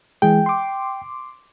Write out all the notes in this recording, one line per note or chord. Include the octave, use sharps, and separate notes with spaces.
E3 G#3 G#4 G5
C6 D6